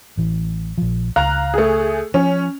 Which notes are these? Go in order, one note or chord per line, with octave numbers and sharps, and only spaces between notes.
A1 E3
A#1 F3
C#2 F5 A#5 F#6
A3 G#4
F3 C#4